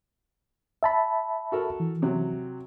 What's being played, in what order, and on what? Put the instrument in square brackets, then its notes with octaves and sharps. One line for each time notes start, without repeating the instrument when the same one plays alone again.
[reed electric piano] E5 A5 B5
[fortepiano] F#4 A4 A#4
[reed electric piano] E3
[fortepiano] C3 F#3